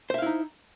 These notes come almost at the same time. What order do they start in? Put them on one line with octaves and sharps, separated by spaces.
C5 E5 F5 E4 D#4